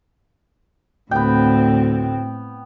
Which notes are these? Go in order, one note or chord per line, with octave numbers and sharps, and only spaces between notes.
D2 A2 B3 C4 G5